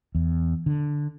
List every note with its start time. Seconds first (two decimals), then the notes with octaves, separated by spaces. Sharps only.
0.15 E2
0.66 D3